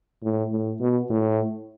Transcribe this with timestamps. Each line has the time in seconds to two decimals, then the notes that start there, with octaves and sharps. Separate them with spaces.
0.24 A2
0.52 A2
0.80 B2
1.10 A2